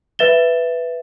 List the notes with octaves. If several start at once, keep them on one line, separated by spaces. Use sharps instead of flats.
B4 E5 A6 E7 G7